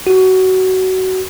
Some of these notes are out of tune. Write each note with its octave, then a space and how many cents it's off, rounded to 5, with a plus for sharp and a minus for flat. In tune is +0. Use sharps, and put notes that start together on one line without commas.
F#4 +20